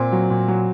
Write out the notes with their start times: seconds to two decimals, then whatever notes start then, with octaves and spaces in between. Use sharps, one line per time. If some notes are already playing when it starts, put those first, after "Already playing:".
Already playing: A#2 C4
0.12 F#3
0.30 A#2
0.48 F#3